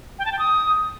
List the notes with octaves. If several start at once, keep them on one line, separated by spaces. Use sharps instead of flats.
G5
A5
G5
D#6